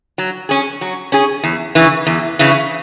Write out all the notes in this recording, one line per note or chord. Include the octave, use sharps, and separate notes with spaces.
F#3
C#4 G#4
F#3
C#4 G#4
E2
C#3 E3
E2
C#3 E3